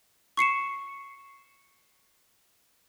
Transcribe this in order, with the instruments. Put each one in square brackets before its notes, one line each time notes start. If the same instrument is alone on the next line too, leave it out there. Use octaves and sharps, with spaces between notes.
[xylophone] C#6 C7 C#7 E7